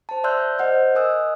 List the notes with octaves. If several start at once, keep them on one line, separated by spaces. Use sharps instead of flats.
C5 A5
D5 E5 C6 E6 F#6 G6
C5 D#5 F#5 F6 G6
A#4 D#5 G#5 D#6 E6 F#6